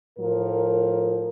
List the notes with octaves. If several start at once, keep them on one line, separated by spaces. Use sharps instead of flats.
A2 F3 A#4